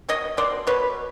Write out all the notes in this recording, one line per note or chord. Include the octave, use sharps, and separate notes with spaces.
B2 C#5 D#5
B2 C5 D5
B2 B4 C#5